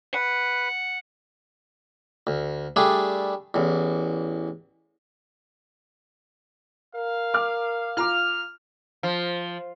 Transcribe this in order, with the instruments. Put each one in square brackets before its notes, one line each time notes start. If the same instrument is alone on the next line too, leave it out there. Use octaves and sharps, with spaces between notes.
[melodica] B4 [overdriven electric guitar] F#5
[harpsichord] D2
G3 A3 D4 G#4
A1 E2
[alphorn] A#4 [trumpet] F5
[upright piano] D6 F6
[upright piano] F4 A#5 D6 [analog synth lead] F6
[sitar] F3